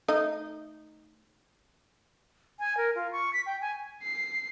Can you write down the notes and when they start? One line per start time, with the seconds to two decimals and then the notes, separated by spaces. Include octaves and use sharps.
0.08 A3 D#4 D#5
2.60 G#5
2.77 A#4
2.96 F4
3.12 C#6
3.33 B6
3.46 G5
3.61 G#5
4.04 C7